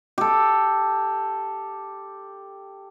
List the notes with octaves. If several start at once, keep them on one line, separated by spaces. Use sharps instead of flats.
G4 A4